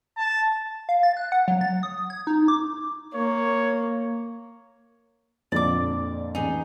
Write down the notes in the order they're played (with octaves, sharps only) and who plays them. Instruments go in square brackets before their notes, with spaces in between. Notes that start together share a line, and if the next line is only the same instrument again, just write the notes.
[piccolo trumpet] A5
[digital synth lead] F5
A6
F#6
F#5
F#3
A6
D#6
G#6
D#4
D6
[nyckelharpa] A#3 [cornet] C#5
[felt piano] F2 A#2 D3 [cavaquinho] D5 D6
[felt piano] A1 [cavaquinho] D#4 G#4